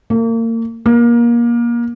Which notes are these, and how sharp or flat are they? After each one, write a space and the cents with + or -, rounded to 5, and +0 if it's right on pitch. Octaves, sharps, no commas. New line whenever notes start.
A#3 -35
A#3 +25